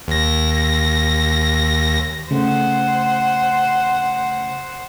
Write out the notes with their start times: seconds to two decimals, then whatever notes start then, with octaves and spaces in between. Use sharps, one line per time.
0.08 D#2 A#6
2.31 C#3 A3 C5 F#5